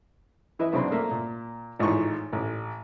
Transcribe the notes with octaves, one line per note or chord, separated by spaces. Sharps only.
E3 E4 B4 D#5 E5
B1 C#3 C4 D4 B5 C6
A3 A#3 E5
A#2
G#1 A2 E3 D#4 F4 C#6
A1